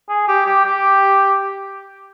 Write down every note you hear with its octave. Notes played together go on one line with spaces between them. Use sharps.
G#4
G4
G4
G4